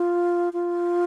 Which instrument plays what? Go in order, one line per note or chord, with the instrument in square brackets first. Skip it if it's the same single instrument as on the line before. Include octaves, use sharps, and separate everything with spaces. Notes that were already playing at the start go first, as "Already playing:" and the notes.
Already playing: [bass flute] F4
F4